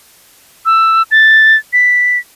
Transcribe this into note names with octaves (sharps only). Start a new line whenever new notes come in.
E6
A6
B6